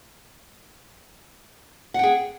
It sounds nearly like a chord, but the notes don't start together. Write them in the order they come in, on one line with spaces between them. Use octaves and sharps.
F#5 G5 G#4